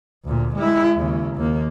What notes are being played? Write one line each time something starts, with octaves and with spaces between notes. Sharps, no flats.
D2 A#2
G#3 E4
D#2 C#3
D#2 A#3